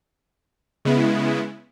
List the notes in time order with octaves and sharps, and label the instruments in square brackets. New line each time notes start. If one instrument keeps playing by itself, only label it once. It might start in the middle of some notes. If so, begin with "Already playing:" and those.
[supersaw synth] C#3 G#3 B3 E4